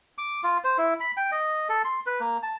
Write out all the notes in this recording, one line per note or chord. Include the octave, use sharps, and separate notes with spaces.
D6
F4
C5
E4
B5
G5
D#5
A4
C6
B4
A#3
A5